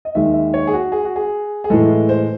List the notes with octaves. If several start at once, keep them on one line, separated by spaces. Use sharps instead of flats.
D#5
D#2 D#3 G#3 E5
E5
C#5
G#4
F#4
G#4
F#4
G#4
G#4
A2 E3 G#3 A4
C5